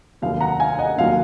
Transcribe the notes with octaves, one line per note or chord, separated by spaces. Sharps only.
F1 D#2 D#3 F#3 F5
F#5 A#5
F5 G#5
D#5 F#5
F1 D#2 D#3 F#3 F5